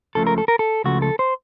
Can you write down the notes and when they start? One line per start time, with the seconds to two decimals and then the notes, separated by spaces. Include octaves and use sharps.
0.15 C#2 C#3 F3 A3 A4
0.27 A#4
0.38 A4
0.48 A#4
0.59 A4
0.84 C#2 C#3 F3 A3 F#4
1.02 A4
1.19 C5